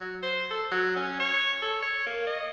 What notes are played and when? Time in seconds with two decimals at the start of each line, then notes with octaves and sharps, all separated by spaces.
0.01 F#3
0.23 C5
0.51 A4
0.71 F#3
0.96 C#4
1.20 C#5
1.62 A4
1.82 C#5
2.07 A#3
2.27 D#5